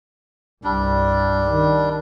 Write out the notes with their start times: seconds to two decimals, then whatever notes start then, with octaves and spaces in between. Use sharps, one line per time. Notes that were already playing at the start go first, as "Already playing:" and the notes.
0.64 C2 G2 G3 D4
1.46 D#3